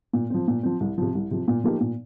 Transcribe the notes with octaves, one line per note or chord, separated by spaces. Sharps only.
A#2
F3 C4
A#2
F3 C4
C2
C3 F3
C2
C3 F3
A#2
F3 A#3 D#4 G4
A#2